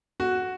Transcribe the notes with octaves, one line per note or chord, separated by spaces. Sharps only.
F#4